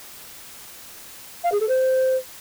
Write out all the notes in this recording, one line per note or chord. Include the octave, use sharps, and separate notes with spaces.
F5
G#4
A4
C5